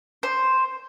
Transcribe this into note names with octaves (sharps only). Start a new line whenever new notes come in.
C5